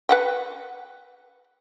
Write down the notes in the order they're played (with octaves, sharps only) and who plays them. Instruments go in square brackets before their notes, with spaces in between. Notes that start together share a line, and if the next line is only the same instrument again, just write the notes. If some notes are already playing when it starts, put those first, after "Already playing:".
[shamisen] B4 F#5 G5